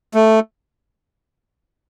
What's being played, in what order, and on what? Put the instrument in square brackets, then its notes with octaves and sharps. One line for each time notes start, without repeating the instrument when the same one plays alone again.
[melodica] A3